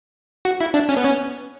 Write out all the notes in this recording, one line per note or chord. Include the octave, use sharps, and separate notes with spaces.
F#4
E4
D4
C#4
B3
C#4